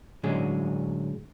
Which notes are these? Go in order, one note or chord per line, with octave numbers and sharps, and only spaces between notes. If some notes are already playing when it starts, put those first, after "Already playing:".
A2 D3 F#3 G#3 C#4 G#4